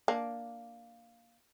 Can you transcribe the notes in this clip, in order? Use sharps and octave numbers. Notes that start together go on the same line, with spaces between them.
A#3 D4